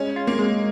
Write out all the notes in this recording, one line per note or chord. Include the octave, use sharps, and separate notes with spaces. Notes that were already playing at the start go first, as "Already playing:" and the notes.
Already playing: G#3 C#4
F4
A#3
G#3